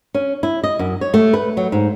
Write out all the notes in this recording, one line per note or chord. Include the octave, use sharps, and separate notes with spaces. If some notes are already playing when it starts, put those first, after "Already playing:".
C#4
E4
D#5
F#2
C#5
A3
B4
F#3
G#2